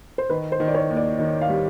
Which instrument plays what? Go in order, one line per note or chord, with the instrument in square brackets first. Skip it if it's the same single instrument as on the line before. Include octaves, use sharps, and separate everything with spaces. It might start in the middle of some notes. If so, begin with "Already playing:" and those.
[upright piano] C5
[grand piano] D#3 [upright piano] B4
[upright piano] C5
[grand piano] D#3
[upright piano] D5
C#5
[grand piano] D#2
[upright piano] D5
[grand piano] D#3 [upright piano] D#5
[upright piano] F5
[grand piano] G3